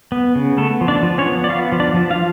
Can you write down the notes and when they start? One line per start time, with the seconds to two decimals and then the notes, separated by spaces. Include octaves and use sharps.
0.12 B3
0.35 C#3
0.57 A3 B3 A4
0.81 F3
0.88 D4 D5
1.03 F3
1.18 C#4 C#5
1.26 B3
1.44 D5
1.49 B3 F4 F5
1.72 F3
1.80 D4 D5
1.94 F3
2.10 F4 F5